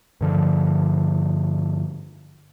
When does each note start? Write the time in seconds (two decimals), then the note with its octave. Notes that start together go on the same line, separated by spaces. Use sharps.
0.21 G2 D3 F3